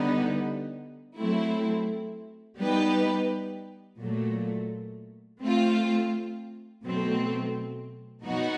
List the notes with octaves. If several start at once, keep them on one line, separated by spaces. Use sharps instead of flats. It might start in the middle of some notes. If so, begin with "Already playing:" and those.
Already playing: D3 G3 B3 D#4
F#3 A3 C4 E4
G3 B3 D#4 G4 B4
A#2 F#3 A3
A3 C4 F4
B2 F#3 A3 C4
B2 F#3 B3 D#4 F#4